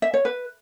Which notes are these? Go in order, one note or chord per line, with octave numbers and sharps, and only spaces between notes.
E5
C#5
B4